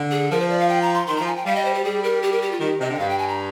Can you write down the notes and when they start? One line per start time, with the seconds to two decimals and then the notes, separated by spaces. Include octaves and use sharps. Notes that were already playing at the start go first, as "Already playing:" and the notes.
Already playing: D3
0.11 G#4
0.31 F3 A#4
0.40 C5
0.49 D5
0.60 F5
0.69 G5
0.82 A#5
0.94 C6
1.07 D#3 C6
1.17 F3 A#5
1.27 G#5
1.36 G5
1.45 G3 F5
1.56 D#5
1.65 C5
1.75 G4
1.84 G3 G#4
2.04 A#4
2.22 G4
2.32 A#4
2.42 G4
2.52 F4
2.60 D#3 G4
2.80 C3 D#5
2.90 D3
2.94 G5
2.99 G2 F5
3.09 G5
3.18 G#5
3.28 A#5